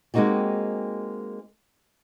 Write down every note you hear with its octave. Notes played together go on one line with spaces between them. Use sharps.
G#3 A#3 C4 D#4 F#4 G4